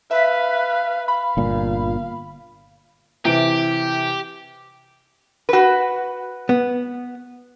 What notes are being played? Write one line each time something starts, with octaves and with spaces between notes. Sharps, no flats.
B4 E5 F5 B6
F5 B5
G1 A#2
C3 E3 G4 D7
F#4 B4
B3